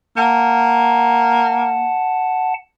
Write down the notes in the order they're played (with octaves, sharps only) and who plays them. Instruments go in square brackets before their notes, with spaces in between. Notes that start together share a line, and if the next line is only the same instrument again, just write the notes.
[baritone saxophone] A#3 [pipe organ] F#5 A5